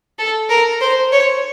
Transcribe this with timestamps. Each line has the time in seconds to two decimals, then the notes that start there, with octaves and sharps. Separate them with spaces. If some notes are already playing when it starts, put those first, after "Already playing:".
0.18 A4
0.49 A#4
0.81 C5
1.12 C#5